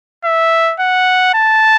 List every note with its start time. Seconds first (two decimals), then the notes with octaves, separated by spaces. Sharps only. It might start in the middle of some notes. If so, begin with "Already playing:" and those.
0.25 E5
0.80 F#5
1.35 A5